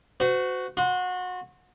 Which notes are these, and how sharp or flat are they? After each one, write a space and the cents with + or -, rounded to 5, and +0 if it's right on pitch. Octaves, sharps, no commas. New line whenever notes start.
F#4 +0 C5 -40
F#4 -25 C6 +0